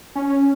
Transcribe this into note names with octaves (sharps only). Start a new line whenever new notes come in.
C#4